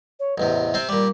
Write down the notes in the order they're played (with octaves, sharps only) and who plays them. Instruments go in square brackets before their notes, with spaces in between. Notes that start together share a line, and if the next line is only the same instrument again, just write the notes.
[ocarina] C#5
[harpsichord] A1 E2 C3 [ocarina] D#5
[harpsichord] C3 C4 C5
[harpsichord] A#2 G3 [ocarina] D6